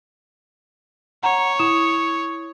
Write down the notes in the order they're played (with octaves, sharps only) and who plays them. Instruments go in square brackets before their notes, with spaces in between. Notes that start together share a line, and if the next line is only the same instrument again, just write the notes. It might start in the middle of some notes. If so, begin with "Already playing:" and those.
[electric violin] C#5 [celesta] F#5 A#5
[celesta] E4 D#6 E7